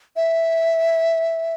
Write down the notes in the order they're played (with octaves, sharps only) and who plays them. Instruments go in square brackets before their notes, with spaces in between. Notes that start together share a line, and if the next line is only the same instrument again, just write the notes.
[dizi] E5